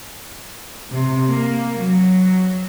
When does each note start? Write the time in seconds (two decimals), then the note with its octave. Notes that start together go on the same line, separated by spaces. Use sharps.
0.91 C3
1.29 A#3
1.79 F#3